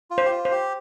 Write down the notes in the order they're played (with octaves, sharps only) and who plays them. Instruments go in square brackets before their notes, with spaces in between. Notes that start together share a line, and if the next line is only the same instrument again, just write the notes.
[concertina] F4
[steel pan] C5
[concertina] G4
F4
[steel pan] C5
[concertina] G4